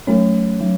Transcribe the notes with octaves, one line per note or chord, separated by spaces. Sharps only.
F#3 A3 C#4 C#5
F#3